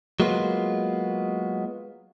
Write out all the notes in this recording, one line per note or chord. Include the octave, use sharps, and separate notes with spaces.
F#3 G#3 A#3 B3 F4